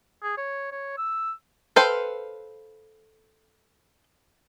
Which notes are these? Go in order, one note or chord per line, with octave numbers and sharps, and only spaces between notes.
G#4
C#5
C#5
E6
A4 B4 C5 F5 G5